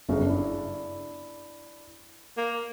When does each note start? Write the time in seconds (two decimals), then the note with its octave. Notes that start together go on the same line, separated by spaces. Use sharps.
0.09 G1 F#2 C#3
0.26 D4 E4
2.37 A#3